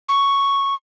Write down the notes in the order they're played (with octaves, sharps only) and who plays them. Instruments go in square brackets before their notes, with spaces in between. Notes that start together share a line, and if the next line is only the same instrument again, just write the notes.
[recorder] C#6